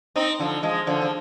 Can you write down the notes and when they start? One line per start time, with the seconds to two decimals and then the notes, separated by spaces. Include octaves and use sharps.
0.16 C4 D#4
0.39 D3 F3
0.63 F3 G#3
0.87 D3 F3
1.02 F3